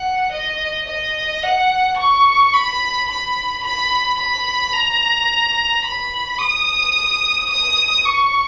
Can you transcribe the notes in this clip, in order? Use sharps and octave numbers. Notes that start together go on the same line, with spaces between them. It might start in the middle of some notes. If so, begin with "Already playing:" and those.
Already playing: F#5
D#5
D#5
F#5
C#6
B5
B5
B5
B5
A#5
B5
D#6
D#6
C#6